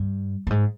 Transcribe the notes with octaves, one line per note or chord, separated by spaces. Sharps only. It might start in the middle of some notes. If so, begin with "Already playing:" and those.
Already playing: G2
G2
G#2